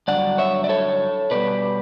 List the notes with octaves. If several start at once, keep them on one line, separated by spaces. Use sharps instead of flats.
G2 D3 F#3 D5 F#5
C#5 E5
D5
A4 C#5
B2 G3 B4 D5